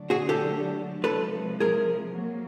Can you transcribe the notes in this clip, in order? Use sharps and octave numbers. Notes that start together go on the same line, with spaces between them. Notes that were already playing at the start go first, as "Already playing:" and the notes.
Already playing: D3 F#3 A3 D4
F#4 G#4
G4 A4
C3 F3 G#3 A4 B4
G#4 A#4
F#3 A#3